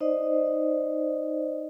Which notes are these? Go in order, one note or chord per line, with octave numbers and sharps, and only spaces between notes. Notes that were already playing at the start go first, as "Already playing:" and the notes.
D#4 C5 D5 D#5